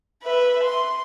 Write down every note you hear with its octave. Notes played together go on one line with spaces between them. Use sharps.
B4 E5
C6